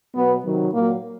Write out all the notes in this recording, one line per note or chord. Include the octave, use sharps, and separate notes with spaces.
B2 F#3 B3
C3 D#3 F#3
A#2 F#3 A#3